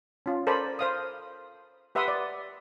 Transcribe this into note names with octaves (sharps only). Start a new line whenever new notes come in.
C#4 F4
A4 A#4 C5 D5 G#5 B5
C5 F5 D#6
G4 B4 E5 F#5 C6 D#6
D5